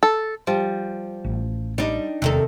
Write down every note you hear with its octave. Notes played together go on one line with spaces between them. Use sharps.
A4
F3 G3
A1
G3 D4 D#4
E1 C3 D#3 A4